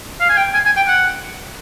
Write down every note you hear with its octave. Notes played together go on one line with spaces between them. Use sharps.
F5
G#5
G5
G#5
G#5
G5
F#5